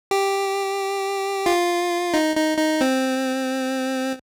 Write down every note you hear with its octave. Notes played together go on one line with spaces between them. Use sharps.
G4
F4
D#4
D#4
D#4
C4